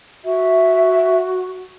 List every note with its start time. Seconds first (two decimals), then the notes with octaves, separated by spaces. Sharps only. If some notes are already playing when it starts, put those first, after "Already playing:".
0.25 F#4 E5